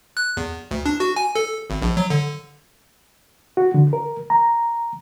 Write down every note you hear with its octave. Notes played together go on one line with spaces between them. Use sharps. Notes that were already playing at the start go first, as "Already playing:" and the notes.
F#6
E2
D2
D4
F#4
G#5
A4
G#1
A#1
F#3
D3
F#4
D3
A#4
A#5